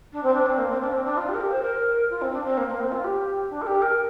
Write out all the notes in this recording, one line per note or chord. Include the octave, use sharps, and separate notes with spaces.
D4
C4
D4
C4
A#3
C4
D4
C4
D4
F4
G4
A#4
G4
C5
A#4
F4
C4
D4
C4
A#3
A#3
C4
F4
G4
D4
A#4
G4
A#4